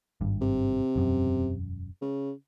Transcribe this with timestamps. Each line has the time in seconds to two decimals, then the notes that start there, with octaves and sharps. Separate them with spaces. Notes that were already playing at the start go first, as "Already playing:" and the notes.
0.21 G#1 G2
0.41 C3
0.96 E1 F#2
2.02 C#3